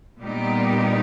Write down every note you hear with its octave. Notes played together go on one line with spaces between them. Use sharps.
A#2 G3 B3 D#4 G4